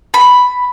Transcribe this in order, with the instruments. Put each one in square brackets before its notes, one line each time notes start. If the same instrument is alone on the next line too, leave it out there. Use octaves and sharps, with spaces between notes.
[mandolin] B5